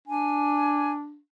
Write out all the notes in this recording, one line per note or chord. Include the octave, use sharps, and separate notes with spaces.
D4 G#5